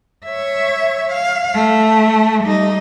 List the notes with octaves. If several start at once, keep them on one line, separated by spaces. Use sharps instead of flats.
C#5 E5
F5
A3
G3 D#4